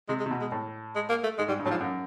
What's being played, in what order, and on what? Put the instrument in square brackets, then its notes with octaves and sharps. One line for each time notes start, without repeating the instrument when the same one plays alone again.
[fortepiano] C3 [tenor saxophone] G#3
[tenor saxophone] G#3
[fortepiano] C3
B2
[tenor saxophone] G#3
[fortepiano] A2
[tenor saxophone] G#3
A#3
A3
[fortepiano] G#2 [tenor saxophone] G#3
[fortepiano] G#2 [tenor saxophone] G3
[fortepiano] G2
[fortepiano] A2 [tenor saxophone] F#3
[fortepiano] G#2 [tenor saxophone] F3
[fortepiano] F#2